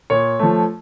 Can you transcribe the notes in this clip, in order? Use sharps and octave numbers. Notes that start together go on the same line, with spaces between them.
A#2 C#5
F3 A3